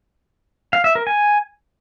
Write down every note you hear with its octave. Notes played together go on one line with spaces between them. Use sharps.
F5
E5
A#4
G#5